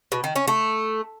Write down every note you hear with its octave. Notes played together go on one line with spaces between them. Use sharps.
B2
D#3
C#4
A3